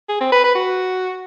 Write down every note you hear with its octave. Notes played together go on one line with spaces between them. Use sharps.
G#4
C4
B4
B4
F#4